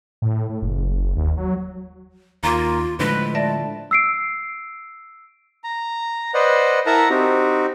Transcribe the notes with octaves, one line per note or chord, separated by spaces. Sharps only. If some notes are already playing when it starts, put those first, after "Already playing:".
A2
A2
F#1
D#2
F#3
D#2 A#3 F4 A#5 C6 D6
A2 D3 F3 G#3 B4
D5 E5 A5 A#6
E6 C7 D7
A#5
B4 C5 D5 D#5 F#5
E4 A#4 E5 F#5 A5 A#5
C4 D#4 F#4 G4